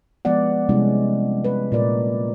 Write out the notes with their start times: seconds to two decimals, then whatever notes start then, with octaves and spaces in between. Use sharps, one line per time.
0.25 F3 G#3 B3 D5 F#5
0.69 C3 G3 G#3 C#4 E4
1.45 B4
1.72 A#2 A#4 D5